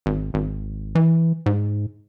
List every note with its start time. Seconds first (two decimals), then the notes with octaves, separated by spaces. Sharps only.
0.06 G#1
0.34 G#1
0.95 E3
1.46 G#2